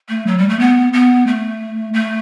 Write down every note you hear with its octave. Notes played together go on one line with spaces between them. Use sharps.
A3
F#3
G3
A3
B3
B3
A3
A3